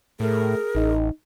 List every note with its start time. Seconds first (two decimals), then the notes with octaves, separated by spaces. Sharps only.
0.20 A2 A3 G#4 A#4
0.75 A1 D#4